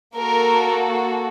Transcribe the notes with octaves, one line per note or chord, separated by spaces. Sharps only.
A#3 F#4 A4 A#4